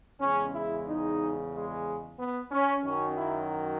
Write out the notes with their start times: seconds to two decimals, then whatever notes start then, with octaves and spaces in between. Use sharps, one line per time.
0.20 E2 C#3 G#3 C#4
0.53 E4
0.86 D#4
1.52 G#3
2.18 B3
2.51 C#4
2.84 F#2 D#3 F#3 C#4
3.17 E4